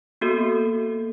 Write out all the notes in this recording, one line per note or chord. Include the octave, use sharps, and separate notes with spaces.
A#3 B3 F#4 A4